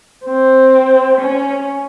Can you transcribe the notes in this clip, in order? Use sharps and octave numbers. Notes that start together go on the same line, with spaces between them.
C4
C#4